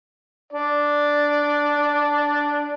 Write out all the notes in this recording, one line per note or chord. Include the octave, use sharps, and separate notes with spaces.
D4 D5